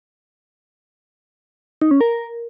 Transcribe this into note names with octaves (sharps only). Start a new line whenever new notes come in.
D#4
C#4
A#4